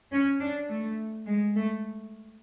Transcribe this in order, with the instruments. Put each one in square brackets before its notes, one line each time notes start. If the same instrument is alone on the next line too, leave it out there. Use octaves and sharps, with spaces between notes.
[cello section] C#4
D4
A3
G#3
A3